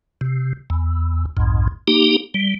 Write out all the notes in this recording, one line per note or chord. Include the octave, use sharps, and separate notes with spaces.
C3
E2
B1 F2 G#2
A#3 D#4 G4
G3